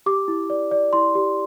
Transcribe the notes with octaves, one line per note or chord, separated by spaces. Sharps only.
G4 D6
E4
D5
D5
E4 C6
G4